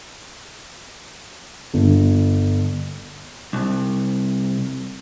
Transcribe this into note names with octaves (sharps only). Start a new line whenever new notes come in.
G1
C2